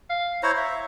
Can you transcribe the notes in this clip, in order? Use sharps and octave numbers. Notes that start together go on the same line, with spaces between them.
F5
E4 C5 C#5 A#5
E5